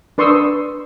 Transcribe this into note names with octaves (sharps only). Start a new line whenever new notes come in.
D4 B4 C6 C#6 D#6 E6